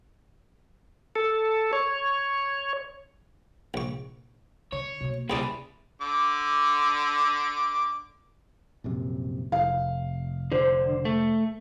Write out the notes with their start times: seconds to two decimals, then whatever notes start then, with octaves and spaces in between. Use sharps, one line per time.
1.16 A4
1.73 C#5
3.74 A#1 C#6
4.72 D3 C#5
5.01 B2 A#3
5.30 C#2 G3 E4 G#4 D5
6.01 D3 D6
8.84 A#1 F#2 C3
9.52 F1 F5
10.52 D3 C5
11.05 A3